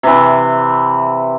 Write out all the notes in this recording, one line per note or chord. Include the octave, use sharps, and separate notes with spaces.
C3 E3